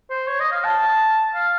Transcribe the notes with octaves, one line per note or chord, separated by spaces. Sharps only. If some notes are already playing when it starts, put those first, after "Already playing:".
C5
C#5
D#5
F5
A5
F5